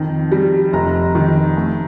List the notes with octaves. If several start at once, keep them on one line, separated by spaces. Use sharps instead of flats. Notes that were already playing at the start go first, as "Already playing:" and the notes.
Already playing: F2 D#3
G3
F1 A#5
D#3
A3